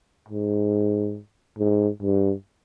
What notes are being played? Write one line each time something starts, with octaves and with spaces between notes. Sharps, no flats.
G#2
G#2
G2